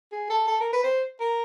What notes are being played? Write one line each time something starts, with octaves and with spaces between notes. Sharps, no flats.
G#4
A4
A4
A#4
B4
C5
A#4